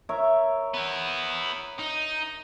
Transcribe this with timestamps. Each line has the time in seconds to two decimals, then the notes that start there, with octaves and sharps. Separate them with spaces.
0.09 A#4 C#5 E5
0.74 B3 E4
1.79 D#4